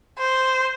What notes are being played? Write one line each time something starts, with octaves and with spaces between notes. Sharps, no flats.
C5